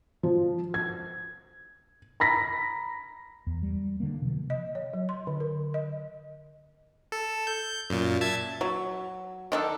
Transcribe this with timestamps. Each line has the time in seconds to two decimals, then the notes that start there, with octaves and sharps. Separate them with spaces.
0.23 F3
0.74 G#6
2.20 A#5 B5 A#6 B6
3.47 E2
3.63 G3
4.00 D3 A#3
4.22 C3 F3
4.50 D#5
4.75 C#5
4.94 F#3
5.09 C6
5.27 D3
5.40 A#4
5.74 D#5
7.12 A4
7.47 G6
7.90 F#2 A#2
8.21 E5 A5 G#6
8.61 F#3
9.52 D#3 D4 A4